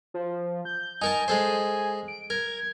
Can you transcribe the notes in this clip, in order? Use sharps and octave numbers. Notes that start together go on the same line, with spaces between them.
F3
G6
D#4 A#4 G#5 A5
G#3 A4 C5
D7
A#4 G#6